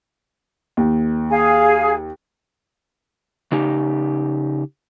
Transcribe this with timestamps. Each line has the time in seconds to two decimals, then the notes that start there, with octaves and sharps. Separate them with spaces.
0.77 D#2
1.30 G#4 F5 G#5
3.52 C#3 D#4 G4